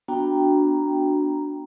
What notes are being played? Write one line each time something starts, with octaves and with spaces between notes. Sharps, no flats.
B3 D4 F#4 G5 A#5